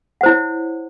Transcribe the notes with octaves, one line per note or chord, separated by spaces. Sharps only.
E4 C5 C#5 F#5